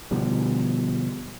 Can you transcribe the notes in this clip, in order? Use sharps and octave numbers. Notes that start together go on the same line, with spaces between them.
B2 D3 F3 G3